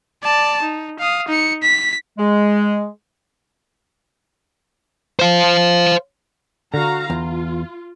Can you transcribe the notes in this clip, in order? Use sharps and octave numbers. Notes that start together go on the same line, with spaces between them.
D5 A5
D#4
F5 D#6
D#4 C#7
B6
G#3
C5 F5
D3 F#4 F5 A#5
E2 F4